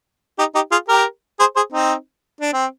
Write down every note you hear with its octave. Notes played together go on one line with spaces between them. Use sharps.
D#4 G4
D#4 G4
F4 G#4
G4 A#4
G#4 C5
G#4 C5
C4 D#4
D4
C4